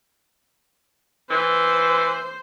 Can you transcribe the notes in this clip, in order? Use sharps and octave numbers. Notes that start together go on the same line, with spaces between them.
E3 C5